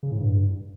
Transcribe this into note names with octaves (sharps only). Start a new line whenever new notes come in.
C#3
A2
G2